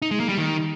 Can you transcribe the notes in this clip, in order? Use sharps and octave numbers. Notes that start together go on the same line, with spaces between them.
D#4
G#3
A#3
G3
D#3